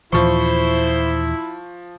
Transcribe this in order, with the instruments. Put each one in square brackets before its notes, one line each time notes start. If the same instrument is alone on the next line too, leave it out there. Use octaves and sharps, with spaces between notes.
[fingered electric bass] D#2 A#2 E3 [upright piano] F3 C#6 [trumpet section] E4 [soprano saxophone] C5